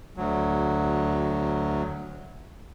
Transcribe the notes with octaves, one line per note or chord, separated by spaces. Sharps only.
D2 F#3